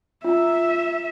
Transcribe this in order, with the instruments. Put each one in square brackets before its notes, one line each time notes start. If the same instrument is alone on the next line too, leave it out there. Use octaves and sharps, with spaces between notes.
[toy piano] F4 A#5 [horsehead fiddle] E5